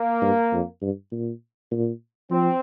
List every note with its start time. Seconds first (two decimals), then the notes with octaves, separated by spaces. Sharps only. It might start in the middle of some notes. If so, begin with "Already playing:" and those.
Already playing: A#3
0.22 G2
0.52 F2
0.82 G2
1.12 A#2
1.71 A#2
2.31 F3 C4